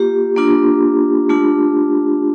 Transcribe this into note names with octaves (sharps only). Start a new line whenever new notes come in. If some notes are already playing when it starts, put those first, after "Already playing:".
Already playing: A#3 F4 G4
A#3 D4 F4
A3 D4 F4